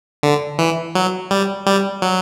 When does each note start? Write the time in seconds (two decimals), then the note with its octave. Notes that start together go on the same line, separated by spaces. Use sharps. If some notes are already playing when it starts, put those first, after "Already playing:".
0.23 D3
0.59 E3
0.95 F#3
1.31 G3
1.66 G3
2.02 F#3